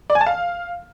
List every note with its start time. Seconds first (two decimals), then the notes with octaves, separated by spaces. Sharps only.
0.10 D5
0.15 G#5
0.21 A5
0.26 F5